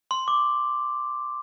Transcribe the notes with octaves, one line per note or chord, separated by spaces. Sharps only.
C6
D6